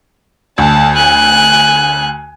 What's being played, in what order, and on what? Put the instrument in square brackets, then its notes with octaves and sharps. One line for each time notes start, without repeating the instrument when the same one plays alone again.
[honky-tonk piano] D2 [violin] A5
[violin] G#5 F#6